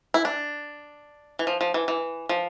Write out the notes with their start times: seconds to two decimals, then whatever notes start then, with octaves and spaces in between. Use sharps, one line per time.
0.14 E4
0.25 D4
1.39 E3
1.47 F3
1.61 F3
1.74 E3
1.88 E3
2.29 F3